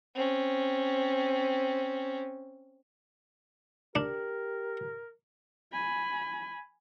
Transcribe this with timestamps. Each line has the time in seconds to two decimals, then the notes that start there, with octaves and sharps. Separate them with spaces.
0.14 C4 C#4
3.96 D4 G4 A#4
5.73 G#5 B5